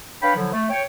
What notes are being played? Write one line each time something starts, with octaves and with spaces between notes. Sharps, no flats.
D4 B4 C#5 F5 G5 B5
D3 F3 F#3 E4
A3
C#5 G5